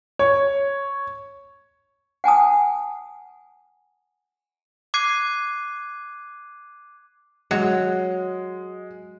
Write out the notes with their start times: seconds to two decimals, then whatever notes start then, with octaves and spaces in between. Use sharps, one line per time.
0.19 C#5
2.24 F#5 G#5 A5 D#6
4.94 D6 F#6 G#6 C7 D#7
7.51 F#3 G#3